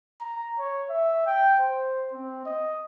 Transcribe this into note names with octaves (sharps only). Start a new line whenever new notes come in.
A#5
C#5
E5
G5
C5
C4
D#5